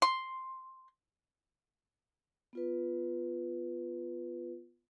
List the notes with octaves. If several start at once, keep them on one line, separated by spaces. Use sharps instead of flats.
C6
B3 F4 B4